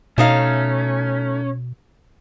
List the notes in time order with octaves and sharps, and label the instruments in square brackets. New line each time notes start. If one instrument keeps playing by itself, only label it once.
[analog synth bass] B2 [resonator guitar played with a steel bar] A3 D#4 F5 [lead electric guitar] C#4